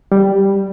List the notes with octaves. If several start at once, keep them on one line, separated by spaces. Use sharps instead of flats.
G3